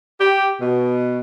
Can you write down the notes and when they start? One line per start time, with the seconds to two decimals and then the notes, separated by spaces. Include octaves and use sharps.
0.20 G4
0.60 B2